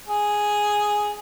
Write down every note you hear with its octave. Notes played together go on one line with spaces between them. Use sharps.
G#4